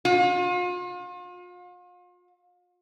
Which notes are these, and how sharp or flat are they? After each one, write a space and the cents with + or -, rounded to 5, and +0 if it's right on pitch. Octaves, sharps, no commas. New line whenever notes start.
F4 +40